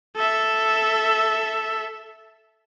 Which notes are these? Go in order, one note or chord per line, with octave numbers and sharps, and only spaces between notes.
A4 E5